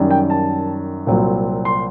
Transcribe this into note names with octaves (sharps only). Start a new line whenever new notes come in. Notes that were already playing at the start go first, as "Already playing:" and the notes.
Already playing: F#2 D#3 G3
G5
A5
C2 A#2 F#3 C4
C6